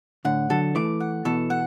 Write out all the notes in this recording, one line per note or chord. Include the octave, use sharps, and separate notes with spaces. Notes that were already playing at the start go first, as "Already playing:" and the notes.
A2 D3 F#5
D3 F#3 A4
E3 A3 D6
F#5
B2 E3 A4
F#5